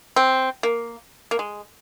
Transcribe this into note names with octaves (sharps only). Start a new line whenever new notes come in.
C4
A#3
A#3
G#3